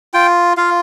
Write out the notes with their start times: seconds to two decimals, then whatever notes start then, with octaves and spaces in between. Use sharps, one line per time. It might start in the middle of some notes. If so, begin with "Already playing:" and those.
0.14 F4 G5
0.57 F4 F5